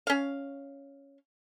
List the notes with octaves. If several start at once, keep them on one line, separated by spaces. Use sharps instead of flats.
C#4 F5